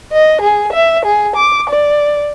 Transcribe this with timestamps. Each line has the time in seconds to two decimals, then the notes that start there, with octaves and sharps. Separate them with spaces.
0.12 D#5
0.41 G#4
0.73 E5
1.05 G#4
1.35 D6
1.69 D5